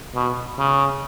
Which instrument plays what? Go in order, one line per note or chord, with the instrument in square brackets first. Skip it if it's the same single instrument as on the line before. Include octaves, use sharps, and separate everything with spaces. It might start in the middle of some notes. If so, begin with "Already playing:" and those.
[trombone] B2
C#3